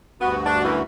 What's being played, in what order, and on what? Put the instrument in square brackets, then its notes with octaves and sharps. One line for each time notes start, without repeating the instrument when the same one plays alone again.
[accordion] D2 G2 F#4 [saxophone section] B3
[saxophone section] D4
F#2 E3